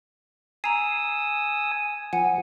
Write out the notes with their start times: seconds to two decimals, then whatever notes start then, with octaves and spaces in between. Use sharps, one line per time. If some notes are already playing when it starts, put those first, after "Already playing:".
0.64 G#5 A#5 D#6 E6 C7
2.13 F3 F#5 G#5